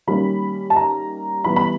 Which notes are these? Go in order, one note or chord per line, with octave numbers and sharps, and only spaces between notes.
D#3 G3 A#3 C#4 B5
A5
A#5
E3 G3 B3 E4 B5
B5